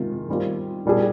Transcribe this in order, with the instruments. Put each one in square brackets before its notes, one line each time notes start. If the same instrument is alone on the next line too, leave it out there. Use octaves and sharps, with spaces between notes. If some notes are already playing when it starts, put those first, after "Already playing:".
Already playing: [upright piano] C3 D#3 G#3 F4
D#3 G3 C4 F4
A#2 G3 D4 G#4